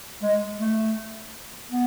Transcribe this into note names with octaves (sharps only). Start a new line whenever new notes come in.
G#3
A3
B3